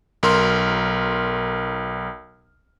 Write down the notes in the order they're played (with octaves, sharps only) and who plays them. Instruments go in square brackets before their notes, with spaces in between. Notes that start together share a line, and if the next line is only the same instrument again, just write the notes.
[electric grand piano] B1 A#4 C6 F6